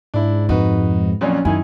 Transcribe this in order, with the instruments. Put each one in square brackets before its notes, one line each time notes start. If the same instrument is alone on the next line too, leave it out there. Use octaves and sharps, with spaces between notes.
[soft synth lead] G#2 [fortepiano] D4 E4
[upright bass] F2 [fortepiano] D#4 F#4 B4
[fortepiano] F2 A#2 F#3 [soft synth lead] C#4
[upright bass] F#2 [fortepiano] D#3 E4 [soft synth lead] G#5